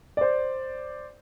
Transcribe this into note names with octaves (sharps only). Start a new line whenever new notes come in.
C5 D5